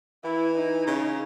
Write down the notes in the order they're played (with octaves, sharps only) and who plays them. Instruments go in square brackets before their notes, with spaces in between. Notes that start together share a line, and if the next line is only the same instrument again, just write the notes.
[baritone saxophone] E3 [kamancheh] E4
[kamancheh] D#4
[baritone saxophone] C#3